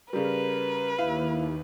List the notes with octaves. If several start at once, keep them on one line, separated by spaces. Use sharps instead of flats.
C#3 G3 A#4 B4
D#2 E4 F5